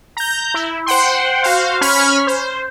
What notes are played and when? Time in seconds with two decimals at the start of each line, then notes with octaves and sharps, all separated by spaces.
0.17 A#5 G6
0.54 E4
0.86 C5 F#5 G5 C6
1.43 F#4 C5 F5
1.81 C#4 B5 C#6 F6 G#6 B6
2.27 C5